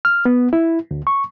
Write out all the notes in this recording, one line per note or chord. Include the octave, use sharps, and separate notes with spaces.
F6
B3
E4
D2
C#6